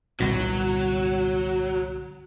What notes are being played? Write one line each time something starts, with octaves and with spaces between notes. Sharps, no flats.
G1 C2 A#2 F#3